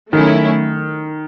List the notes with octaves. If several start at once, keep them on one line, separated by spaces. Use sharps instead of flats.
D#3 F#3 A3 C#4 E4